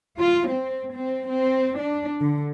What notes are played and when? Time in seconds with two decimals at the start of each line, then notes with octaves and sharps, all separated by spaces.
0.18 F4
0.48 C4
0.93 C4
1.29 C4
1.78 D4
2.20 D3